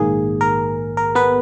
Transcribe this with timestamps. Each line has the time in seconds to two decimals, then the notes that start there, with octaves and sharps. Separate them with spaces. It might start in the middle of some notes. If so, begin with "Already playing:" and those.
Already playing: A#1 G#2 D#3 A#3 G#4
0.41 A#4
0.97 A#4
1.15 B3 B4